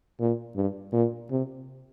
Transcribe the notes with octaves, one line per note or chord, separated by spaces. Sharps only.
A#2
G2
A#2
C3